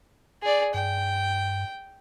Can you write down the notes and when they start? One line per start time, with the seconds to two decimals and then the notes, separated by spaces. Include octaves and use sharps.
0.42 G#4 D5
0.74 G2 G5